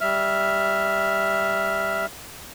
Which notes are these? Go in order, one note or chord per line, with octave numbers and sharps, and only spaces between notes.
G3 E5 F6